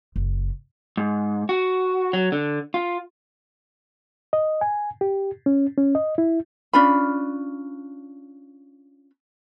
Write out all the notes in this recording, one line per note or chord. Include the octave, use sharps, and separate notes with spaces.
F#1
G#2
F#4
F#3
D3
F4
D#5
G#5
G4
C#4
C#4
D#5
E4
C#4 D4 F4 B5